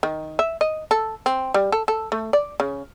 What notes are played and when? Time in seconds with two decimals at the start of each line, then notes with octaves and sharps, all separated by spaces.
0.03 D#3
0.39 E5
0.61 D#5
0.91 A4
1.26 C4
1.54 G3
1.72 A4
1.88 A4
2.12 A3
2.33 D5
2.60 C#3